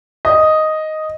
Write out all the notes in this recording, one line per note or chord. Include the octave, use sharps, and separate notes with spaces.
D#5